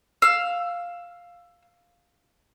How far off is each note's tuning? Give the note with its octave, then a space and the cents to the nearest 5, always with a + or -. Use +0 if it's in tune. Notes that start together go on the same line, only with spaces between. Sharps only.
F5 +5 E6 +15